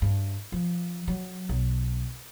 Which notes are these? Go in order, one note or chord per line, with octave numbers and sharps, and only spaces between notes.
G2
F3
F#3
B1